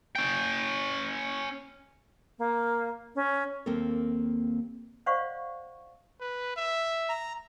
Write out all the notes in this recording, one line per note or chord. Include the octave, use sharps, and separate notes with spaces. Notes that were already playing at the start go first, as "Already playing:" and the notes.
C#4 G5
A#3
C#4
D#2 A#3 C4 A4 A#4
C5 D5 D#5 F5 F#5 C#6
B4
E5
A#5